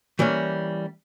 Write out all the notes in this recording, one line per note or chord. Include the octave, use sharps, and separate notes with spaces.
E3 G3 A#3 C#4